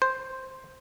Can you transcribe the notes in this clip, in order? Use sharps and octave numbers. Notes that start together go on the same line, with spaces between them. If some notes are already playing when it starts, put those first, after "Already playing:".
C5